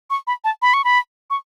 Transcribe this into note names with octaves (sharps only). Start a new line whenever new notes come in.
C#6
B5
A5
B5
C#6
B5
C#6